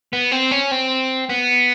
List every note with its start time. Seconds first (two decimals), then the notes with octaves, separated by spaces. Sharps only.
0.13 B3
0.32 C4
0.51 C#4
0.71 C4
1.29 B3